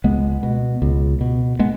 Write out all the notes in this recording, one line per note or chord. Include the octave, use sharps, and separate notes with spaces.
C#2 G#3 B3
B2
C#2
B2
G#3 B3